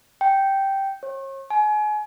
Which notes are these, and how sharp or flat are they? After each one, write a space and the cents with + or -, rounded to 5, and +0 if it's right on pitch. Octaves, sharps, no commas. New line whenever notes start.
G5 -5
C#5 -40
G#5 +30